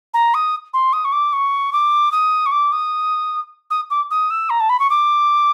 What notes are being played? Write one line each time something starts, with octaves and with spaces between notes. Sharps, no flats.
A#5
D#6
C6
D#6
C#6
D6
C#6
D6
D#6
C#6
D6
D#6
D#6
D6
D#6
E6
A#5
A5
B5
C#6
D6